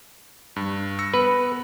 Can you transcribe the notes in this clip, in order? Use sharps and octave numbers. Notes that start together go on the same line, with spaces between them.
G2
E6 A#6 C#7
B3 B4